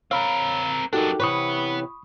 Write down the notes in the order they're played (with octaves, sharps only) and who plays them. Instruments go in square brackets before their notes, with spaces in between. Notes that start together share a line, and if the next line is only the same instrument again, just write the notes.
[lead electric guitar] C4 A#4 [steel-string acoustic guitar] C#5 [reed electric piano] F5 B5
[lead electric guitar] F#2 D4 [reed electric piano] D#4 F#4 A4 [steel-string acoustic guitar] G4 A#4
[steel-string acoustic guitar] C3 E3 C#5 [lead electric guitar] B4 F#5 [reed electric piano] B5 C#6 D#6